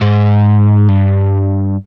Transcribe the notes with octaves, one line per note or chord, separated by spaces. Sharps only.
G#2
G2